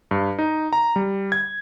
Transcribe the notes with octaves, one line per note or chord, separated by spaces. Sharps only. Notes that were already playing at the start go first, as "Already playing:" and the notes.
G2
D#4
A#5
G3
G#6